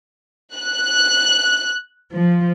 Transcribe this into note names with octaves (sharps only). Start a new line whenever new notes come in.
F#6
F3